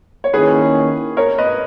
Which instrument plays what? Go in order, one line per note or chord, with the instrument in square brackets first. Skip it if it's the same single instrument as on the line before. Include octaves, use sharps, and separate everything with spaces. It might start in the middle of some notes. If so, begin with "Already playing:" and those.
[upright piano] C#5
[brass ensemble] D#3 A#3 C#4 E4 [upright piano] G#4 B4
[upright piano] A#4 C#5
B4 D#5